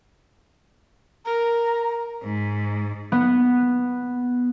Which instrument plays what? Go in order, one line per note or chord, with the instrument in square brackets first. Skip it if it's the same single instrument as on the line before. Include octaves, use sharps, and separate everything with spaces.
[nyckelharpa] A#4 [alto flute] A#5
[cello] G#2
[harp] B3